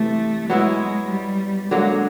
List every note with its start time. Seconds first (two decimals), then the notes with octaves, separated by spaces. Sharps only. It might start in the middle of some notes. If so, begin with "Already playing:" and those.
Already playing: C3 E3 A3
0.50 F#3 G#3 B3 E4
1.10 G3
1.71 D3 F#3 G#3 A#3